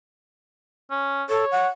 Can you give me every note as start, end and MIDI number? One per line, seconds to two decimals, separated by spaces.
0.91 1.23 61
1.29 1.45 69
1.29 1.67 73
1.51 1.67 78